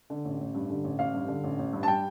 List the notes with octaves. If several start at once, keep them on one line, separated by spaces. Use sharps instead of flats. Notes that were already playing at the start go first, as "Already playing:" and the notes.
D3
A1
A1
G2
D3
A1
A1 F5
G2
D3
A1
A1
G2
A5
G3 G5